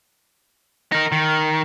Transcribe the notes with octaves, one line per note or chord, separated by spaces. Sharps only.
D#4 A#4
D#3